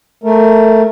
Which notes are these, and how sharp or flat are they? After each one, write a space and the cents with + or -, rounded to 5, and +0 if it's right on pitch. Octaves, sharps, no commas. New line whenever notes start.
A3 +0 A#4 -5